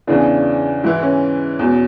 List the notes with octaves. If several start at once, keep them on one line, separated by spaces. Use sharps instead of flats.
E2 C#3 E3 D4
G#2 E3 E4
C#4
E2 B2